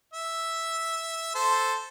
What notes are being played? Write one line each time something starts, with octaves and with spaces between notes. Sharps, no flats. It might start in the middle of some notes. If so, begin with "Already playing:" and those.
E5
A4 C5